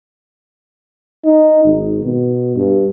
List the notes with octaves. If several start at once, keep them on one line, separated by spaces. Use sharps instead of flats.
D#4
G#1
B2
G2